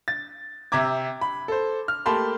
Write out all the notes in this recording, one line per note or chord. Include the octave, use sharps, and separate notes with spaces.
A6
C3 E5 A#5 D6 G#6
B5
A4 C5
F6
A3 A#3 G4 A5 B5 C6